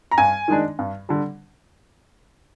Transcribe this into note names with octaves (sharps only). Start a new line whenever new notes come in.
A#5
G2 G#5
D#3 G#3 D4
G2
D3 G3